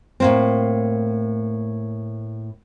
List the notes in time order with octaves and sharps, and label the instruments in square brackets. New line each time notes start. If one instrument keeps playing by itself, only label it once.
[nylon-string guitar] A2 A#3 C4